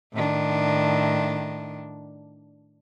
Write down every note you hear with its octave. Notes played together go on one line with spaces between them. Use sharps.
A2 D#3 D4